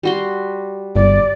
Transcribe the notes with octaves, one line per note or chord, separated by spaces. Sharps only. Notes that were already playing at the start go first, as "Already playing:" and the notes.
G3 F#4 C6
G1 D5